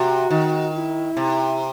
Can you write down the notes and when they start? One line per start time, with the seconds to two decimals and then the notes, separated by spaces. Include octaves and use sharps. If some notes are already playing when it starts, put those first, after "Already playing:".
Already playing: C3 F#4
0.30 D#3
0.74 E4
1.17 C3